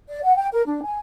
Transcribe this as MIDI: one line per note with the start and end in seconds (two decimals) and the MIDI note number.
0.08 0.19 74
0.22 0.36 78
0.36 0.47 79
0.52 0.63 70
0.66 0.80 62
0.82 0.98 80